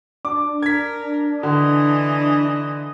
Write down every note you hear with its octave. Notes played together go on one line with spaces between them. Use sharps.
D4 D6
A#4 G#6 B6
D3 E3 D#5